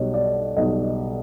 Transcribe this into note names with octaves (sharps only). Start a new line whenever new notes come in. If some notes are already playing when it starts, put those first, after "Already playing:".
Already playing: B1 B2 G3 C#5
D5
B1 B2 G3 D#5